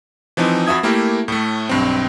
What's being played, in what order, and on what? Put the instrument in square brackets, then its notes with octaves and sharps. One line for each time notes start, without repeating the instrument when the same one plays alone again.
[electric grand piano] E3 F3 C4 D#4
F2 F#4 E5 D#6 G#6
A3 A#3 E4 G4 A#4
A2 A3
B1 G2 C4